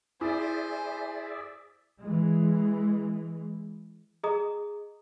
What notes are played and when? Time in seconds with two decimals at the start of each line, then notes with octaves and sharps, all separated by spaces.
0.21 E4 G#4 C5 D5 E5 G#5
2.01 E3 G#3
4.24 G#4 D#5 A#5 D#6